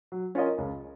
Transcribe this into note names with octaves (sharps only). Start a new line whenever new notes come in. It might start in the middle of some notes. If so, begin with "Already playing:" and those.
F#3
C#4 F4 A#4 D#5
C#2